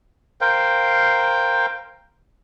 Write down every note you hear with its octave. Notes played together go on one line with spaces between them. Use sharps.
A#4 C5 F5 G5